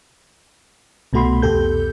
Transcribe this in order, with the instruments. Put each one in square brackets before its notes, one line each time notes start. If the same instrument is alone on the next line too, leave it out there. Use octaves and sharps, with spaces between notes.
[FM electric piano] C2 B2 A3 F#4 B5 C6
C2 F2 B2 G4 A4 G6